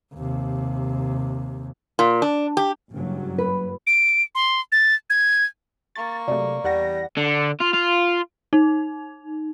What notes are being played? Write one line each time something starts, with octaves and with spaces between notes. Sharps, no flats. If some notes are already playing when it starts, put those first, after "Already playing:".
D#2 C3
A#2
D4
G4
F#1 G2 F#3
B4
D7
C6
A6
G#6
A#3 C#6 A6
C3 F#3 A3 D5
E2 G3 F#5 A#6
D3
F4
F4
D#4